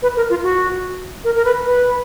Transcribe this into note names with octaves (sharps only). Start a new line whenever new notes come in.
B4
A#4
F4
F#4
A#4
A#4
B4
B4